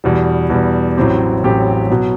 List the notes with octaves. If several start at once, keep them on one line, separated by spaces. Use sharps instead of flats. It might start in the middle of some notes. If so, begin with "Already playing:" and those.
E2 B2 G3
E2 B2 G3
A1 A2 F#3 C4 G4
A1 A2 F#3 C4 G4
B2 F#3